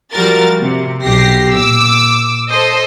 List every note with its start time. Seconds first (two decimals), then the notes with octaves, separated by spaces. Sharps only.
0.12 F3 G3 F#4 A#4 A6
0.60 C3
1.03 B1 G4 A#6 C7
1.55 A#2 D6 E6
2.50 A4 C5 D#5